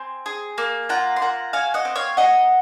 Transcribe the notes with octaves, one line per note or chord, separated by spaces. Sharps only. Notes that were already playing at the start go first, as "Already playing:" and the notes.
Already playing: C4 G#5 C6
G#4
A#3
F4 F#5 A#5
C6
A#3 F#5 A#5
F#4 F5 G#5
D#5 F#5
C4
C#5 F5
D#4 D#5 F#5